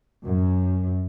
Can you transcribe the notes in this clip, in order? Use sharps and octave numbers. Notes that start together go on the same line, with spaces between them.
F#2